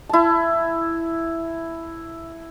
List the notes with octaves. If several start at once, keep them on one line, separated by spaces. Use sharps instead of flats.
E4 A5